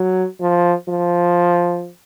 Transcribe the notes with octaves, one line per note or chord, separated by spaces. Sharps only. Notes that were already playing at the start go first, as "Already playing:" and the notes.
Already playing: F#3
F3
F3